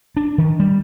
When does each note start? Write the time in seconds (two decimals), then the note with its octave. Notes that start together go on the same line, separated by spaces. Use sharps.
0.17 D4
0.38 D#3
0.60 G3